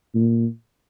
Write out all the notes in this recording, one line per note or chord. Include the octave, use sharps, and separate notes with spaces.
A#2